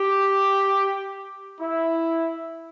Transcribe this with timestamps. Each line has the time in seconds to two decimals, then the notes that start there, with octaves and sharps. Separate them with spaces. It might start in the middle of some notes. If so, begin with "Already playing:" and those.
Already playing: G4
1.59 E4